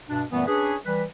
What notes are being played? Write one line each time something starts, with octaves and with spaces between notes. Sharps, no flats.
G2 B2 D4
F#2 A#2 E3 G3 A3 B3
C#4 D4 G#4 B4
E3 G3 B4